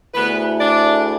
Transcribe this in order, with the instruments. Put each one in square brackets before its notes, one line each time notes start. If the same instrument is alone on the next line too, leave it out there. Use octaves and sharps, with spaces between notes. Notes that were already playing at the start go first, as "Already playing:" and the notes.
[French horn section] D2 D3 A3 E4 G#4 [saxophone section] B3 B4
[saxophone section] D4 D5